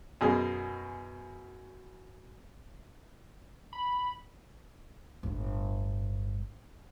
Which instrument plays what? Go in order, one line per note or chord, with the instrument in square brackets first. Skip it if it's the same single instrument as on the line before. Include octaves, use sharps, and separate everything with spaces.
[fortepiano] F#2 B2 G#4 D#5
[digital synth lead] B5
[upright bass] G1 A2